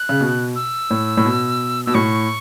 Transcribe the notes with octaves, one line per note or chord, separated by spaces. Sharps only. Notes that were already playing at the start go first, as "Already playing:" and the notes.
Already playing: F#6
C#3
B2
E6
A2
A2
B2
B2 E6
A2 C#6